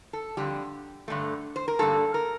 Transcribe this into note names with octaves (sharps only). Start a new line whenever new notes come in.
A4
F2 D3 G3 G4
G2 D3 A3
C5
A#4
G2 D3 G3 A#3 A4
A#4